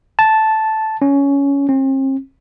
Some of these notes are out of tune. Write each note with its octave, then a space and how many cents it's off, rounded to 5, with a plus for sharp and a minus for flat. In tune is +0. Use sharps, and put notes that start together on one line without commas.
A5 -5
C#4 +15
C4 +45